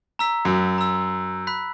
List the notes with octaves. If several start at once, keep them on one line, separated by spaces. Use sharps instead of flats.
A#5 E6 B6
F#2
A#5 E6
B5 F#6 B6